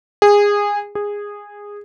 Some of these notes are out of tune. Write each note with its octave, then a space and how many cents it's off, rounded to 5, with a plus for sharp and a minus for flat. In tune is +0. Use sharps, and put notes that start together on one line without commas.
G#4 -20
G#4 -15